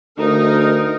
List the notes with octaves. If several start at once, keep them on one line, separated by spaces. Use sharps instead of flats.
D2 D#4 A#4